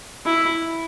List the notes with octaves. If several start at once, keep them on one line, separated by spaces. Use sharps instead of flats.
E4